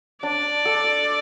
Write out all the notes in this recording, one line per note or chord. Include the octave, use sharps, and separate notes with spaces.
D4 D5
A4